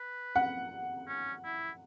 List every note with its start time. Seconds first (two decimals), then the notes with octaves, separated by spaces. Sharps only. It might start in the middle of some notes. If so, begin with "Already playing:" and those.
Already playing: B4
0.36 F#5
1.08 C#4
1.45 E4